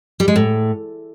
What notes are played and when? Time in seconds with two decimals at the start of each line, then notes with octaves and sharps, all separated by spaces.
0.20 G3
0.28 G#3
0.36 A2